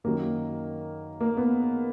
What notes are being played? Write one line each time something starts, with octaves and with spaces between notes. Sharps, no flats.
F#2 D#3 F#3 A#3
A#3
B3